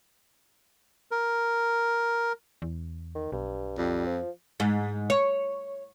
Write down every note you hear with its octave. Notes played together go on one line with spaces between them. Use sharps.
A#4
E2
D#3
B1 G2
F2 G3
F3
G#2
C#5